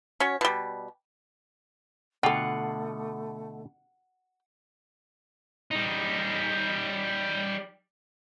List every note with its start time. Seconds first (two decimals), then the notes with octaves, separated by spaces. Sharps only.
0.20 C#4 F#4 C#5
0.41 B2 G3
2.23 B2 D3 A3 F4 A4 F#5 G5
5.71 G3 D#4